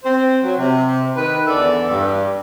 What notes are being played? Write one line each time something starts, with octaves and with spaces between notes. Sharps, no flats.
C4 C5
F#3
C3
D#3 B4
E2 D3 A4 D5 E5
G2